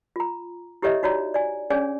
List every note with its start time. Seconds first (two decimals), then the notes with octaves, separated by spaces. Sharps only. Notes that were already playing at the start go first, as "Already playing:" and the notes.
0.16 F4 A#5
0.82 E4 G4 A4 C#5 D#5 E5
1.03 D#4 F#4 C#5 D5 A#5
1.34 D5 G#5
1.70 C#4 D4 G#4 C#5 D5 G#5